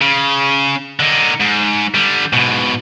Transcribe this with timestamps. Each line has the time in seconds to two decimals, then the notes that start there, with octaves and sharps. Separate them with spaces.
0.02 C#3
1.00 D3 D#4
1.40 G#2
1.94 D3 G3
2.33 G#2 B2